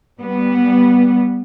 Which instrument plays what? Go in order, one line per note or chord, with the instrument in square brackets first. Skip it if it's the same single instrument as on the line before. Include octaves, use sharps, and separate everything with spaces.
[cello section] G3 B3